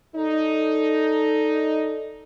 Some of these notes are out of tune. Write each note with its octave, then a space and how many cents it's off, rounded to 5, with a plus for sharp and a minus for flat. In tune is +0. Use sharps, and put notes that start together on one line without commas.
D#4 +0 A4 +0 D5 +0